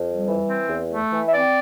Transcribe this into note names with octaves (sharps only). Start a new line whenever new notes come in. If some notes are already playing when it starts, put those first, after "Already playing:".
Already playing: F2
G3
E3
C4
E2
A3
E3
E5
C4 D5